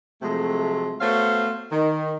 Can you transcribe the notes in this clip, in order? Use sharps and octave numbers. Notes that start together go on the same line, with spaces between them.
C3 F3 F#3 G#3 A3
A3 B3 F#4 C5 C#5 F5
D#3